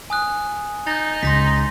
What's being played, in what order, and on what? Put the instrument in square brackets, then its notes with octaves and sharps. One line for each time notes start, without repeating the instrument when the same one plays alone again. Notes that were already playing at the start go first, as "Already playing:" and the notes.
[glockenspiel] G#5 D#6 F#6
[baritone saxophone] D#4 [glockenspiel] G6 A6
[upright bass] C#2 [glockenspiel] C6 A#6 B6